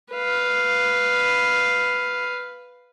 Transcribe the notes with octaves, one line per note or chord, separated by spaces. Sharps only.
B4 F5